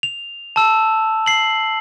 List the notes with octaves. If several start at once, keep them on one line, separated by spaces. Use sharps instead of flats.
F7
A5 E6
C7 F#7